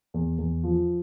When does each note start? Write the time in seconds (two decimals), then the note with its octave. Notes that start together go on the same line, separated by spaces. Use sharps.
0.14 E2
0.38 E2
0.63 F3